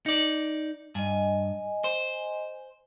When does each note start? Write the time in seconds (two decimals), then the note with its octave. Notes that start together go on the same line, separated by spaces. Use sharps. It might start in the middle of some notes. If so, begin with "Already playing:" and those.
0.06 D#4 D5
0.95 G2 D#5 G#5
1.84 C5